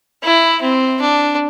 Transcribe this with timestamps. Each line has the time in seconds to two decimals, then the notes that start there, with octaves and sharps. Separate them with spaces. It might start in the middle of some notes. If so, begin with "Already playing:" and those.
0.24 E4
0.62 C4
1.01 D4